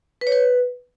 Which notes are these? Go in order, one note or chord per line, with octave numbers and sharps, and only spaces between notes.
B4
C#5
B4